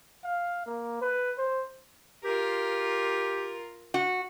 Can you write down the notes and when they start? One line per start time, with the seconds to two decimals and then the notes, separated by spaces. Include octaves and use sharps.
0.24 F5
0.66 A#3
1.02 B4
1.38 C5
2.24 F4 G4 A#4
3.94 F#4